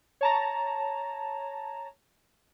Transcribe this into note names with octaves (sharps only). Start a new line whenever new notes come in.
C#5 A5 A#5